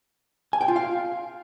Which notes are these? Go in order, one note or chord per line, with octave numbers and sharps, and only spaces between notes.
G#5
G5
F4
F5